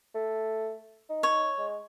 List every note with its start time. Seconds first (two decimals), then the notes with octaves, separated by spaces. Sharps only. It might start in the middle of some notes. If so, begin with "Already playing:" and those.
0.15 A3
1.09 D#4
1.23 C#5
1.59 G#3